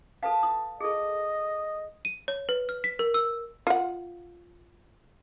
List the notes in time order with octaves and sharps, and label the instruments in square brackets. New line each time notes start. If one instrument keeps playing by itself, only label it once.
[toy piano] A4 B4 F5 [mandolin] A5
[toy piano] D#6
[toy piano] G#4 A4 [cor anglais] D#5
[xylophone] D#7
C#5
B4
F6
B6
A#4
E6
[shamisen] F4 F#5